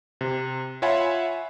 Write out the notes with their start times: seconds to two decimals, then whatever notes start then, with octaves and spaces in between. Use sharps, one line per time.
0.21 C3
0.82 F4 C#5 E5 F#5 G#5 B5